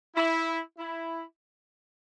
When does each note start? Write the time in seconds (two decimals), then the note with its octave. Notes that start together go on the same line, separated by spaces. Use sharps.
0.16 E4
0.78 E4